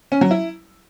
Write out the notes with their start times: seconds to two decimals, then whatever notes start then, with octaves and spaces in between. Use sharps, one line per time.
0.12 C#4
0.21 F#3
0.31 E4